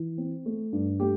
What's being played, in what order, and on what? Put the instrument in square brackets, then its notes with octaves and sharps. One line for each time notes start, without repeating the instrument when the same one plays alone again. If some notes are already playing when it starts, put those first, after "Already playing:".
Already playing: [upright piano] E3
C4
A3
G2
A3 G4